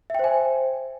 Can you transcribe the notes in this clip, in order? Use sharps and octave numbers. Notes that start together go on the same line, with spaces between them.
C5 E5 G5 G#5